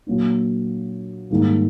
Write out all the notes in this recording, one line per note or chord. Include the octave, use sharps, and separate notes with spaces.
A#2 F#3 A#3 D4
G#2 D#3 G3 A#3